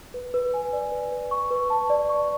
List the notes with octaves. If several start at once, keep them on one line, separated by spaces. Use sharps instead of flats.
B4
B4
G#5
D5
B4
B4
C#6
B4
A5
D5
C#6